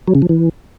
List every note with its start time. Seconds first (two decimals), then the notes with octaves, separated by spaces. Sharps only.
0.08 F#3
0.15 C#3
0.22 F3
0.29 E3